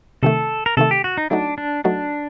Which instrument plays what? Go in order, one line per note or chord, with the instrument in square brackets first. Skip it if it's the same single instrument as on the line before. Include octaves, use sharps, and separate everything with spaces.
[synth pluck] C3 D#3 A3 [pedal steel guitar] A4
[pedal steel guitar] A#4
[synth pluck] C3 D#3 A3 [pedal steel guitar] A4
[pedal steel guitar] G4
F#4
D#4
[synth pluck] F#3 A3 D#4 F#4 [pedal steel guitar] D4
[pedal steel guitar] D4
[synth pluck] F#3 A3 D#4 F#4 [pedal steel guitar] D4